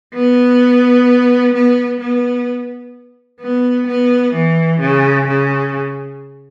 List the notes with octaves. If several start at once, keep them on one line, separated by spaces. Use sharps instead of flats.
B3
B3
B3
B3
B3
E3
C#3
C#3